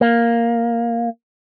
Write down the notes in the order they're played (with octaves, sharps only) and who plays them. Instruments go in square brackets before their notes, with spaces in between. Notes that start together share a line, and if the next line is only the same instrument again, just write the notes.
[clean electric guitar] A#3